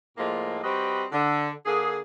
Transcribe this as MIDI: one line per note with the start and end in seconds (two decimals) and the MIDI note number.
0.18 0.58 45
0.18 0.58 53
0.18 0.58 56
0.18 0.58 58
0.63 1.04 55
0.63 1.04 60
0.63 1.04 66
0.63 1.04 71
0.63 1.04 75
1.12 1.49 50
1.66 1.98 50
1.66 1.98 58
1.66 1.98 68